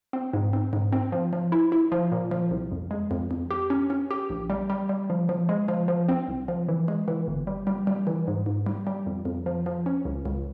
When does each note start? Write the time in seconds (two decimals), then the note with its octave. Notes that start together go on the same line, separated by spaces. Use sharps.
0.13 C4
0.33 G#2
0.53 C4
0.73 G#2
0.93 C4
1.12 F3
1.33 F3
1.52 E4
1.72 E4
1.92 F3
2.12 A#2
2.31 F3
2.51 C2
2.72 F2
2.91 G#3
3.11 F2
3.31 F2
3.51 G4
3.70 C#4
3.90 C#4
4.11 G4
4.30 A#1
4.50 G3
4.70 G3
4.89 G3
5.10 F3
5.29 F3
5.49 G#3
5.68 F3
5.88 F3
6.09 C4
6.28 C2
6.48 F3
6.68 E3
6.88 G#3
7.08 E3
7.28 G1
7.47 G3
7.67 G3
7.87 G3
8.07 E3
8.27 G#2
8.46 G#2
8.66 G3
8.87 G3
9.06 F2
9.25 F2
9.46 F3
9.66 F3
9.86 C#4
10.05 C#2
10.26 C#2